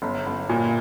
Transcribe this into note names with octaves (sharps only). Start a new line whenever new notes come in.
G1
G1
A#2